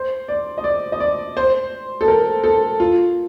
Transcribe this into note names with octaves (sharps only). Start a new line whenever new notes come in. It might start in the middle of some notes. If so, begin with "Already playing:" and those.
Already playing: C5
D5
D#5
D5
D#5
D5
C5
A4
A#4
A4
F4